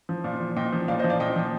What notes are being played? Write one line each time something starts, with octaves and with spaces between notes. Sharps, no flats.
F3
A#2 D5 F5
F3
A#2 D#5 G5
F3
A#2 D5 F5
C5 D#5
F3
D5 F5
A#2 D#5 G5
F3